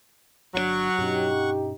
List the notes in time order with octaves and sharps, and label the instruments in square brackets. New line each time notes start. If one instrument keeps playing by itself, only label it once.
[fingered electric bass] G1 D3 D4 [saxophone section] F#3 [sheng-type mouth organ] F#5 C#6
[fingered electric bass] G2 B2 C#4 [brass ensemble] D#4 G4